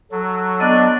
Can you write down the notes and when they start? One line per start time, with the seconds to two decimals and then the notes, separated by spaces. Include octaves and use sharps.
0.12 F#3 A4
0.60 B3 D4 D5 D#5